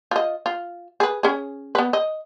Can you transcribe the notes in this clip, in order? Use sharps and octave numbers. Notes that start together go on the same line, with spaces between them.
F4 D#5
F4
G#4 B4
C#4 G#4
B3 B4
D#5